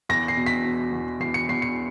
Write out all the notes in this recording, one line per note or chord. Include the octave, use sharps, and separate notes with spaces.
E2 A#6
C7
B2
B6
B2
E2
E2 C7
C#7
E2 C7
C#7